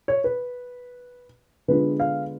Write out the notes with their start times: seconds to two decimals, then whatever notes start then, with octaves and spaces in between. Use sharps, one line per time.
0.08 C#5
0.24 B4
1.68 D3 G#3 B3 D4 F4 B4
2.00 F5